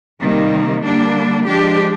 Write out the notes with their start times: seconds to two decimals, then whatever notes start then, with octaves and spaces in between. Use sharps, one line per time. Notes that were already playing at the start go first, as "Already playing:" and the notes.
0.21 C3 D#3 G3 A#3
0.84 D3 G3 A#3 D4
1.46 F3 G#3 D4 G4